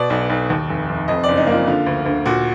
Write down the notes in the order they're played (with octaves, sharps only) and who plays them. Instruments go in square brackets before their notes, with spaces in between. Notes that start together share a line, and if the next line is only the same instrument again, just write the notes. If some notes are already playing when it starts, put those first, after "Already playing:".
Already playing: [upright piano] B2 D5
B1
B1
D#2
F1
F1
F2 D#5
F#1 D5
D#4
A#3
F4
D3 F4
D2
D2
A#2 F#4